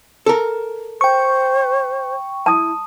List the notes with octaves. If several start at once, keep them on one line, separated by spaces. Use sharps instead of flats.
A4 A#4
C5 G5 C#6
E4 A5 D#6